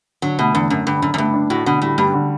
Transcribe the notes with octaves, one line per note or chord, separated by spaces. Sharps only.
D3 F#3
B2 A3
E2 D3
F#2 D3
G2 D3
F#2 D3
F#2
G2 A3
D4
A2 F#4
B2 D3
A2 G3
G2 G3
D3